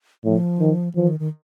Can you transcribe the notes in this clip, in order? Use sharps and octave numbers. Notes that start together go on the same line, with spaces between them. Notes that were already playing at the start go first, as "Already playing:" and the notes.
A2 F3
D#3
E3 F3
D#3
D#3